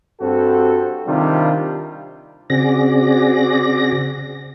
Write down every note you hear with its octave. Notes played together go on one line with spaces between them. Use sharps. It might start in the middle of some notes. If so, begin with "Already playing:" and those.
G2 C4 F#4 A4
C3 D#3 G3 D4 F4
C#3 C4 F#4 G#4 D5 A#6